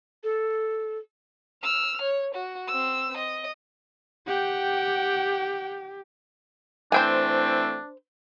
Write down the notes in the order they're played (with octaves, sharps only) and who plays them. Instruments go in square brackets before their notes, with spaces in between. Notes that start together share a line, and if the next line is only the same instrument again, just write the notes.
[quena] A4
[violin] E6 F6
C#5
F#4
C4 E6
D#5
[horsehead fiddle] G4 [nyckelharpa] F#5 G5
[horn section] E3 A3 C4 [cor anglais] D4 [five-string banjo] C5 G5 G#5